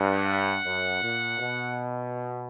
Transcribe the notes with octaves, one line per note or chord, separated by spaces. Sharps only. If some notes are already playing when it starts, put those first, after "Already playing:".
Already playing: G2 F#5
F#2
A#2
B2